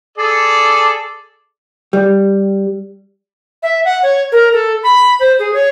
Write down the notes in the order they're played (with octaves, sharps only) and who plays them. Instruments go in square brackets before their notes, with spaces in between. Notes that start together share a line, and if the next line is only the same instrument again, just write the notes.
[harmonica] G#4 A4 D5
[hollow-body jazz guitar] G3
[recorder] E5
F#5
C#5
A#4
A4
B5
C5
G#4
C#5